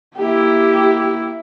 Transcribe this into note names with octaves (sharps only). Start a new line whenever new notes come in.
A#3 E4 G4